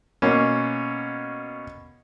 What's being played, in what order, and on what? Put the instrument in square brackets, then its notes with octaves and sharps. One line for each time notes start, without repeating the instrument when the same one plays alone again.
[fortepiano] B2 A#3 C#4